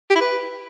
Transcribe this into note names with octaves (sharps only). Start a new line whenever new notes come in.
G4
E4
B4